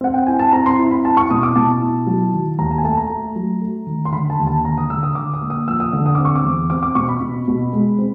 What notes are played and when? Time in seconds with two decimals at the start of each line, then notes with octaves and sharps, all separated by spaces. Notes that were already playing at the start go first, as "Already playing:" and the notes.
0.01 C4 F#5
0.14 G5
0.27 E4 G#5
0.39 A5
0.53 C4 A#5
0.66 C6
0.79 E4
0.91 B5
1.05 E4 A5
1.17 C#6
1.30 B2 D#6
1.43 D6
1.56 B2 A5
1.82 E4
2.07 F#3
2.33 D#3
2.59 D#2 A#5
2.71 A5
2.78 G#5
2.84 A3 A5
2.97 A#5
3.10 A3
3.36 F#3
3.62 A3
3.87 D#3
4.05 C6
4.12 D3 B5
4.30 A5
4.39 D#2
4.47 A5
4.64 D3 A#5
4.78 D#6
4.90 D3 E6
5.03 D#6
5.15 D3 D6
5.34 D#6
5.41 A#3
5.50 D#6
5.67 F3 E6
5.80 D#6
5.93 D3
6.06 D#6
6.15 C4 D6
6.25 C#6
6.35 D6
6.44 E2
6.70 C4 D6
6.83 D6
6.95 B2 C#6
7.09 B5
7.21 B2
7.48 B2
7.73 G#3
7.99 C4